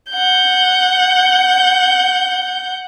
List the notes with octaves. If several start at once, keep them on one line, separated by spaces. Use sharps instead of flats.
F#5 G6